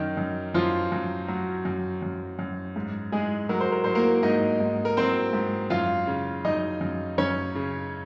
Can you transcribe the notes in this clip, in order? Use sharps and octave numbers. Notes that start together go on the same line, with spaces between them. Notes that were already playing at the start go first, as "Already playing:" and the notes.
Already playing: F#2 D#3 D#4
F#2
F#2 F3 F4
F#2
F#3
F#2
F#2
F#2
G#2
G#2 G#3 G#4
F#3 A#4
C5
A#4
F#3 C5
A#3 A#4
G#2 D#4 D#5
G#2
A#4
F#3 C4 C5
G#2
F#2 F4 F5
C#3
F#2 D#4 D#5
F#2
F#2 C#4 C#5
C#3